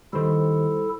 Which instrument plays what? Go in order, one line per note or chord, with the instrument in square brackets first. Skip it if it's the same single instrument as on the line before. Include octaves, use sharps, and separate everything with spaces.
[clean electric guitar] D#2 D#3 [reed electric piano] G3 C5 [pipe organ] E4 A4